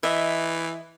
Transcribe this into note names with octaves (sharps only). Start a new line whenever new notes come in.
E3 D#5 E5